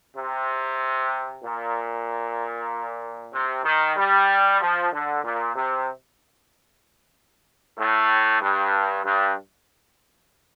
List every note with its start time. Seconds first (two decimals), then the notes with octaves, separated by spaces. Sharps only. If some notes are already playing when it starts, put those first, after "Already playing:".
0.15 C3
1.42 A#2
3.33 C3
3.64 D#3
3.96 G3
4.60 F3
4.92 D3
5.23 A#2
5.55 C3
7.77 A2
8.41 G2
9.05 G2